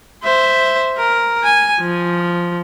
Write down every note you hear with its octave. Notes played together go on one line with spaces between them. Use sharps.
C5 E5
A#4
G#5
F3